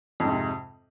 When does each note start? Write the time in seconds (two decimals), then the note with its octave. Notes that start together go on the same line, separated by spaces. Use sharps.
0.20 F2
0.24 G#2
0.28 C3